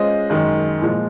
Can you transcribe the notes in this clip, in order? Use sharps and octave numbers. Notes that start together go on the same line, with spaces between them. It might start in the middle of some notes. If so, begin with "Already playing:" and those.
Already playing: G#3 C#4 F4 C5 D#5
F#2 D#3 G#3
A#2 F3 G#3